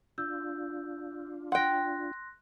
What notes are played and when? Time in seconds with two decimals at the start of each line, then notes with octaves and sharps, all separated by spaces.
0.18 D4 F4 E6 G6
1.52 F#5 G5 C6 F#6 A#6